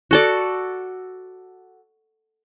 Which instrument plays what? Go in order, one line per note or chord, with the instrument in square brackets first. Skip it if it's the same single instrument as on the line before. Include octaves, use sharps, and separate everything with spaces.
[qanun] F#4 A4 D5